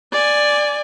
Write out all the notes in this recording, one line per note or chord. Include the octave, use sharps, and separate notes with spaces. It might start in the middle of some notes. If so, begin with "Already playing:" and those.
D5 G#5